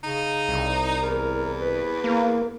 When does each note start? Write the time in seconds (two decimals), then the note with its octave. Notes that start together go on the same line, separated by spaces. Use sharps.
0.04 C#3 D#4
0.48 C2
1.02 E2 A#4
1.61 B4
2.04 A#3